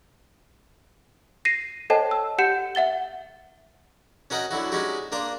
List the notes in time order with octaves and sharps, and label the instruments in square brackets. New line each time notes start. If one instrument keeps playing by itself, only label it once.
[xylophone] A#6 C7 D#7
A4 C5 C#5 D#5 G5 A5
E6
G4 F#5 G6 C#7 E7
E5 F#5 A6 G7
[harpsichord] C#4 F#4 A#4 D#5 F#5 G5
D3 F#3 E4 F#4
G#3 C#4 D#4 F#4 G4
A#3 D4 A#4 C6